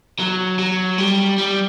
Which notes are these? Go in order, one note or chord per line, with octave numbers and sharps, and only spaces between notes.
F#3
F#3
G3
G3